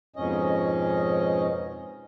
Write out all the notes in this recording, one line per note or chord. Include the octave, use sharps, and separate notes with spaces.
F2 G#2 B2 C#4 D#5